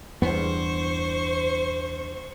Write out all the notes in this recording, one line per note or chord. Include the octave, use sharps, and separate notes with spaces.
E2 G2 B3 C5 C#6